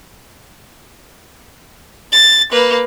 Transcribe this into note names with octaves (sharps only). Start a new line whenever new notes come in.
A6
A#3 B4